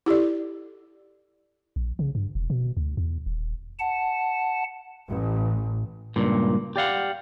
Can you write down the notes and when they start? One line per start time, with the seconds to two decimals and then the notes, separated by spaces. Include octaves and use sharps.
0.06 E4 G4 A4 D5
1.76 A#1
1.99 C#3
2.15 G2
2.35 E1
2.50 B2
2.77 D2
2.97 E2
3.26 D#1
3.79 F#5 A5
5.07 A1
6.16 C#2 G2 A#2
6.76 G4 D5 F5 F#5